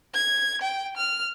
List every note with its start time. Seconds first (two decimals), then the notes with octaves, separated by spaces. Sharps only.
0.14 G#6
0.62 G5
0.97 F6